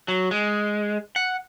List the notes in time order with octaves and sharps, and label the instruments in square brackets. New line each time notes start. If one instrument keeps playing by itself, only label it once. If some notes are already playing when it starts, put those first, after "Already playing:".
[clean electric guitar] F#3
G#3
F#5